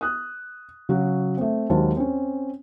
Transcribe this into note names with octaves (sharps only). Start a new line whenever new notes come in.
D#6 F#6
C#3 F#3 F#4
A3 C4
D#2 F#3 G#3 C5 A5
C4 C#4